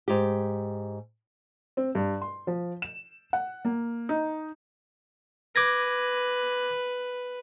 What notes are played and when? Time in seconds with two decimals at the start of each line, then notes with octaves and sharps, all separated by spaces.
0.08 G#2 G4
1.77 C4
1.95 G2
2.22 C6
2.47 F3
2.82 E7
3.33 F#5
3.65 A#3
4.09 D#4
5.56 B4 D6 G#6 A#6